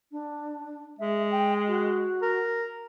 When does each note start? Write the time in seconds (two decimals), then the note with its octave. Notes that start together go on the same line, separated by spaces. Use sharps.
0.12 D4
0.99 G#3 E5
1.31 G5
1.68 F#4
2.22 A#4